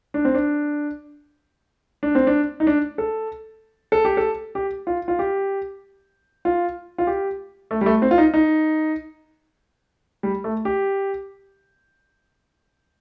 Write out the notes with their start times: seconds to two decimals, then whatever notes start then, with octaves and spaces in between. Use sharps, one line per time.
0.14 D4
0.25 C4
0.35 D4
2.03 D4
2.15 C4
2.27 D4
2.60 D#4
2.67 D4
2.98 A4
3.92 A4
4.05 G4
4.17 A4
4.55 G4
4.87 F4
5.08 F4
5.19 G4
6.45 F4
6.98 F4
7.07 G4
7.71 A3
7.81 G3
7.86 A3
8.02 C4
8.11 F4
8.18 D#4
8.34 D#4
10.23 G3
10.44 A3
10.65 G4